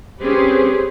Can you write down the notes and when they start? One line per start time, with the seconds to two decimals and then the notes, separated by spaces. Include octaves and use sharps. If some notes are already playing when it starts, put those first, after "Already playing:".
0.21 C4 C#4 G4 G#4 B4 C5